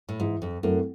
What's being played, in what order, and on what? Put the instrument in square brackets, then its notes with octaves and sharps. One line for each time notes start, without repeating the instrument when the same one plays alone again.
[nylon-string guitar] A2
[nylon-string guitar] G#2 [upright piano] E3
[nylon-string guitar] F2
[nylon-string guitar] F#2 [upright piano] A3 C4 E4 A4